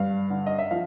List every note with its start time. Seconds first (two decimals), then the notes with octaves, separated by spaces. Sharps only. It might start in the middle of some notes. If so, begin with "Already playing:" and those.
Already playing: G2 F5
0.30 D3
0.46 D#5
0.59 E5
0.71 F3 F5